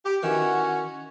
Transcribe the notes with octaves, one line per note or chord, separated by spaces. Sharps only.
G4
D#3 E3 C#4 F#4